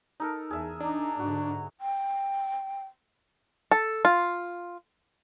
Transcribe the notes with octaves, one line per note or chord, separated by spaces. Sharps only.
D#4 A4 A#4
E2 G#4 E5
D4 D#4 A#5
G#2 D3 F#4
G5
A4
F4